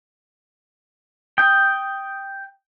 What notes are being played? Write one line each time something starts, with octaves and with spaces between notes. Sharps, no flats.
G5 D#6 G6